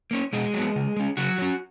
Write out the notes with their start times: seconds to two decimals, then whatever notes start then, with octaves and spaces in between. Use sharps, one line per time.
0.11 A#3 C#4
0.33 B2 G#3 G#4
0.54 F#3 B3
0.76 C#3
0.97 G#3 C#4
1.17 C#3 F#3 F#4
1.38 F#3 C#4